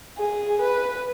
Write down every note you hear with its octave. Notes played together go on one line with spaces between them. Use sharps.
G#4
B4